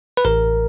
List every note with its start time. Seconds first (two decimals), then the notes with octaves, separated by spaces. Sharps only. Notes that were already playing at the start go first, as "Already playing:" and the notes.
0.17 B4
0.25 A1 A#4